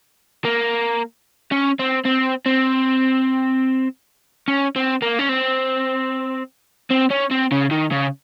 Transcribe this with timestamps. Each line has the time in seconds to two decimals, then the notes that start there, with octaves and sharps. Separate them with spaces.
0.45 A#3
1.51 C#4
1.79 C4
2.05 C4
2.46 C4
4.48 C#4
4.76 C4
5.02 A#3
5.19 C#4
5.29 C4
6.91 C4
7.11 C#4
7.31 C4
7.52 C#3
7.71 D#3
7.91 C#3